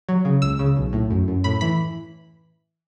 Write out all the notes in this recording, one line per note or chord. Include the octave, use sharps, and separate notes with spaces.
F#3
C#3
C#2 E6
C#3
B1
A2
F#2
F#2
A2 B5
E3 B5